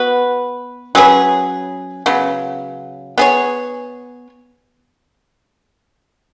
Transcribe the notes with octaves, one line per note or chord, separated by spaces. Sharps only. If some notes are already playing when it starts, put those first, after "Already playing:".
Already playing: B3 F#4 B4
F#3 C#4 G#4 B4
C#3 F#3 B3
B3 G#4 C#5